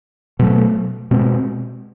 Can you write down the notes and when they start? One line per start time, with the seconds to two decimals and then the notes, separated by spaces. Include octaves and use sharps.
0.39 B2 F#3 A3
1.11 B2 G#3 C4